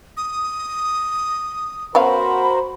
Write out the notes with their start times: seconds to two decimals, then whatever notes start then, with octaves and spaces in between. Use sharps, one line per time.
0.17 D#6
1.95 B3 C#4 F#4 A#4 C5 F5 B5